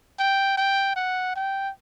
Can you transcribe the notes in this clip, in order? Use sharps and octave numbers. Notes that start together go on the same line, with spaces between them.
G5
G5
F#5
G5